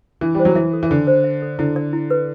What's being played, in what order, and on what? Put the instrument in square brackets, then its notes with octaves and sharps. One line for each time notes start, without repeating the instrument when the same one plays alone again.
[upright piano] E3 [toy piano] D4
[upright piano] G3 [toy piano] C5
[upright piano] F#3
[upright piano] E3 [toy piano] E5
[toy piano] A4
[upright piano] E3
[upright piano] D3 [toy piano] D4
[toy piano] C5
E5
A4
[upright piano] D3 [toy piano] E4
[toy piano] D5
E4
B4